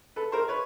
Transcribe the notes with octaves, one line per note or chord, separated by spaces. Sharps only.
A4 B4
A#4 C5
B4 C#5